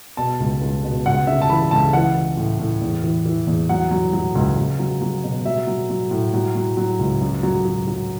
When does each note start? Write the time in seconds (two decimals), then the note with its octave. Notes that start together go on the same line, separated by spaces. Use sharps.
0.17 B2 A5
0.40 C#2
0.62 C#2
0.84 B2
1.06 C#2 F#5
1.27 C#3 E5
1.42 A5
1.49 E3 B5
1.71 C#2 A5
1.93 E3 F#5
2.16 E3
2.37 A2
2.59 A2
2.81 E2
3.03 E3
3.26 E3
3.47 E2
3.69 F#3 F#5
3.91 F#3
4.13 F#3
4.35 C#2
4.57 C#2
4.79 F#3
5.02 F#3
5.24 B2
5.45 F#3 E5
5.67 F#3
5.90 F#3
6.11 A2
6.33 F#3
6.55 F#3
6.77 F#3
6.99 C#2
7.21 F#2
7.43 F#3
7.65 F#3
7.87 F#3